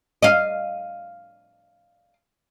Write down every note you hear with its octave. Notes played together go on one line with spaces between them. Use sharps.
D#5 F5